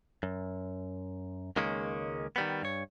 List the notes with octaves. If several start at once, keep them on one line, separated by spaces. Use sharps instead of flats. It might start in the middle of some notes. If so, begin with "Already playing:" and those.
F#2
C#2 D#3 G#3 A#3 C#4
D#3 G3 B3
G2 C#5